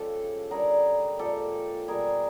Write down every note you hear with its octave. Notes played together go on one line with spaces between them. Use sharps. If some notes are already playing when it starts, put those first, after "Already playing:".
Already playing: C#3 F3 G#3 G4 A4
D3 G3 G#4 A#4
A#2 F3 G#3 G4 A4
B2 G3 G#4 A#4